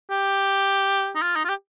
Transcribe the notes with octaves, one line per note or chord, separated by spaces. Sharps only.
G4
D#4
F4
D#4
F4
G4